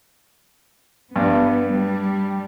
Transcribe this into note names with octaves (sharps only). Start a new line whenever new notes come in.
G2 B3
G3